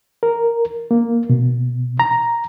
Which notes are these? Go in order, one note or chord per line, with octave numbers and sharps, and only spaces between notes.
A#4
A#3
B2
A#5